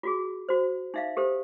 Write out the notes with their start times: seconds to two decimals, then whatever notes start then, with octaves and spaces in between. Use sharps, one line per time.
0.03 F4 F#4 G#4
0.49 F#4 C5
0.94 D#4 E5 F5
1.17 G4 A4 C5